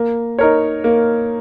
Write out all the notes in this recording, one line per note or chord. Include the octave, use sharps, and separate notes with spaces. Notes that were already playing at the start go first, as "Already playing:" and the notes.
Already playing: A#3
D#4 A#4 C#5
A#3